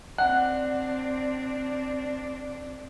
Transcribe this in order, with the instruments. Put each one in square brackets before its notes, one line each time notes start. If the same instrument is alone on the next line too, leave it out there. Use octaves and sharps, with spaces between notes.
[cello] C4 D4 [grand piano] F#5 [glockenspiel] F#6